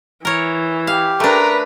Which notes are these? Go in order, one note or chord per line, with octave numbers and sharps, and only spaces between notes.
E3 A#4 C#5
G4 F5
A3 D4 A#4 B4 A#5